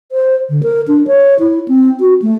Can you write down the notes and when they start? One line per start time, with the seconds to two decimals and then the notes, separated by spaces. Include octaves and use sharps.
0.12 C5
0.49 D3
0.63 A#4
0.88 D4
1.07 C#5
1.39 E4
1.68 C4
2.00 F#4
2.22 A3